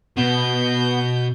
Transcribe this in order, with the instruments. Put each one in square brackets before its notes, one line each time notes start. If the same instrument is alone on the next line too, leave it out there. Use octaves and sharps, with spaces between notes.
[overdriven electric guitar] B2 [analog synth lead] B3 [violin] G6